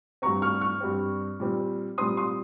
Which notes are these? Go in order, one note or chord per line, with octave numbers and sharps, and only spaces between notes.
G2 G3 C4 A#5 C#6
C#6 F6
C#6 F6
G2 G3 C4
A#2 G3 C4
A#2 G3 C4 C6 D#6
C6 D#6